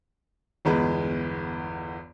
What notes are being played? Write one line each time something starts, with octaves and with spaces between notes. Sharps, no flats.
G1 E2 G#3 B4